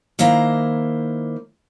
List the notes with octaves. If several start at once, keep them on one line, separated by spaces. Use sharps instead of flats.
D#3 A#3 E4 C5 A#5